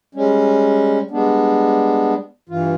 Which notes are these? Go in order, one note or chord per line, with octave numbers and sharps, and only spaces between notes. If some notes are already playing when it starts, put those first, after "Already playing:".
G3 G#3 C#4
G3 G#3 B3 D4
G2 E3 F4